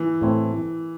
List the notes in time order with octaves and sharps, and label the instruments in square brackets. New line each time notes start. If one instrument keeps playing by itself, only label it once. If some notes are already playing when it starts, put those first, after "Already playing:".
Already playing: [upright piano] E3
[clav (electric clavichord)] A2 A3 C4 E4